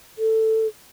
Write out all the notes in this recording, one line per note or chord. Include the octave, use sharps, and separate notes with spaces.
A4